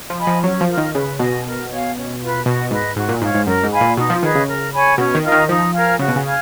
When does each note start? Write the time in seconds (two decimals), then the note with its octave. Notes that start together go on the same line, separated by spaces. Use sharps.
0.10 F3
0.19 D#5 G#5 B5
0.27 F3
0.44 F#3 C#4
0.61 F3
0.69 F4 A#4
0.77 D#3
0.95 C#3 B4
1.19 B2 D#5 G#5
1.45 A#4
1.71 C#5 F5 G#5
1.95 C#4
2.21 F4 B4
2.46 B2 F#4
2.71 G#2 B4 D#5
2.96 G#2 F#4
3.09 A#2
3.21 G#2 C#5 F5
3.35 G#2
3.46 F#2 A#4
3.64 G#2
3.72 F5 G#5 B5
3.81 A#2
3.97 B2 D#4
4.10 F3
4.22 D#3 G#4 B4 D#5
4.35 C#3
4.48 A#4
4.73 C#5 G#5 B5
4.98 B2 C#4
5.15 D#3
5.23 F4 A#4 D#5
5.32 D#3
5.49 F3 D#4
5.73 A#4 F5 G#5
5.99 C#3 F#4
6.08 B2
6.16 C#3
6.25 F5 G#5